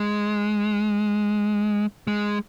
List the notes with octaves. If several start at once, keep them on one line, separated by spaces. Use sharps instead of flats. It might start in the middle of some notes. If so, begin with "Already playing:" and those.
Already playing: G#3
G#3